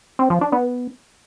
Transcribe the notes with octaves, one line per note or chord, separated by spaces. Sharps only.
C4
F3
D4
B3